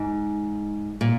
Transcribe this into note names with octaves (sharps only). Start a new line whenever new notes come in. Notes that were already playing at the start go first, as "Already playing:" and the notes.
Already playing: G#2
A#2